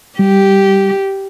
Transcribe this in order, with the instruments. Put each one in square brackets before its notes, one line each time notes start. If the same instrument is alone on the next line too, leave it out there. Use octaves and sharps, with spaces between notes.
[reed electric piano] G3 [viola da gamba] G4